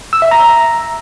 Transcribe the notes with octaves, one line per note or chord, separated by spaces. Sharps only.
E6
E5
A#5